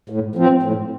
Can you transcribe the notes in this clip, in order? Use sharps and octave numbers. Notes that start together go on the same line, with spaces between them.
A2
F3 C4
A2